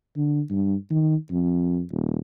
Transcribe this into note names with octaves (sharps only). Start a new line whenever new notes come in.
D3
G2
D#3
F2
D#1